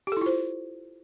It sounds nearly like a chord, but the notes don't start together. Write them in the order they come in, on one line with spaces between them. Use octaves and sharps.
G4 A4 E4 F4 C5